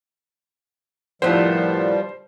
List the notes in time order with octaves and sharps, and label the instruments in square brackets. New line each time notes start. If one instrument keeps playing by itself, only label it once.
[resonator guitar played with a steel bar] A2 D#3 B3 [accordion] F3 G3 [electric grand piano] C5